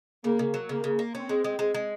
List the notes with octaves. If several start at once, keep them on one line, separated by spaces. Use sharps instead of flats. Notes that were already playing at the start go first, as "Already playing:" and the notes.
C#3 A#3
C#3
F#3
C#3 A#3
C#3
A#3
C4 C#4
G#3
G#3
G#3
G#3